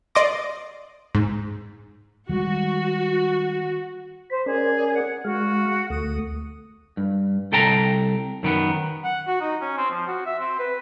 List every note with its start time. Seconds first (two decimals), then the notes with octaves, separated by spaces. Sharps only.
0.15 D5 D#5 C6 D6 A#6
1.15 G#2
2.29 D#3 G3 G#3 F#4
4.30 C5 B5
4.46 C#4 G#4 A#4 D5
4.94 F#5
5.25 G#3 F#4 F5
5.90 D2 A3 D#6
6.97 G2
7.52 C2 A4 G5 A#5
8.43 F#2 D#3 B3
9.04 F#5
9.27 F#4
9.40 D#4
9.61 C#4
9.77 C4
9.91 F3
10.07 F#4
10.26 E5
10.39 C4
10.59 B4